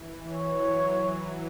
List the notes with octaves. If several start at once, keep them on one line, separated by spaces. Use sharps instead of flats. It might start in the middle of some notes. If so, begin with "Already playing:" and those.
Already playing: E3
F#3 C#5